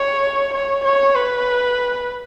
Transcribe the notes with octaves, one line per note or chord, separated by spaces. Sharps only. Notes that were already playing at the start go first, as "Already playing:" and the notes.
Already playing: C#5
C#5
C#5
B4